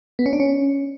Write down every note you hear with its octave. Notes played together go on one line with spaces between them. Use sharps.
B3
C#4
D4
C#4